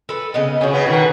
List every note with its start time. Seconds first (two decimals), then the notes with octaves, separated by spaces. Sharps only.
0.09 A4 B4
0.34 C#3 B3 D#5
0.61 C#3 C#4 F#4
0.73 C#3 B3
0.86 B2 D3 D#3 F#4